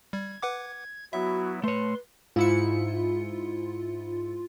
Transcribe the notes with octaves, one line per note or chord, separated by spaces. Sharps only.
G3 G#6
B4 F#5 D6
F#3 B3 E4 F#4 E5
A3 B4 C#5 C6
G#2 E4 F4 C#7